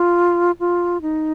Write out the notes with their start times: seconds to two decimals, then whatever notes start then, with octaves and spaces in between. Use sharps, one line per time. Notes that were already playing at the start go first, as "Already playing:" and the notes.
Already playing: F4
0.60 F4
1.02 D#4